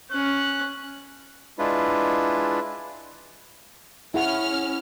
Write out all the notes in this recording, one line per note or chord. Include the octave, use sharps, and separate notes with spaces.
C#4 F#6
G#3 D4 E4 F4 B4
C#4 E4 G#4 F#5 F6